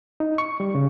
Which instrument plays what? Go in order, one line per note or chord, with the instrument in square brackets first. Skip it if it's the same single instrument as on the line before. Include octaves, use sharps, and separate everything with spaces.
[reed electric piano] D#4
C#6
G3
C#3